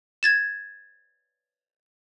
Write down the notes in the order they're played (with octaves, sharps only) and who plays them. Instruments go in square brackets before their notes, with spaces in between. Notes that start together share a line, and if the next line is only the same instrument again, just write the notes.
[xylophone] G#6 A6 E7